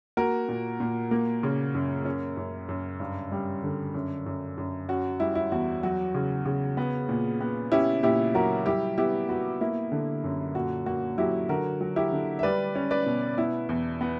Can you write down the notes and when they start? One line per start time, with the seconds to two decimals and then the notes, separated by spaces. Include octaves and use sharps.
0.17 A#3 F#4 A#4
0.48 A#2
0.80 A#2
1.11 A#3
1.43 C#3
1.74 F#2
2.05 C#4
2.37 F#2
2.69 F#2
3.00 G2
3.32 G3
3.63 D3
3.94 F#2
4.26 F#2
4.58 F#2
4.89 C#4 F#4
5.20 G3 E4
5.35 E4
5.51 E2 F#4
5.83 F#3 F#4
6.15 C#3
6.46 C#3
6.77 B3
7.09 A#2
7.41 B3
7.72 C#4 E4 G4
8.03 A#2 E4 G4
8.34 F#3 F#4 A#4
8.66 G3 E4 G4
8.98 B3 E4 G4
9.29 B3 F#4
9.61 A#3 E4
9.92 D3
10.24 F#2
10.55 A#2 F#4
10.86 A#3 F#4
11.18 F#3 E4 G4
11.49 D3 F#4 A#4
11.81 F#3
11.96 E4 G4
12.12 D3
12.39 E5
12.43 G3 B4 D5
12.75 C#4
12.91 B4 D5
13.06 B2
13.38 B3 E4
13.69 E2
14.01 B3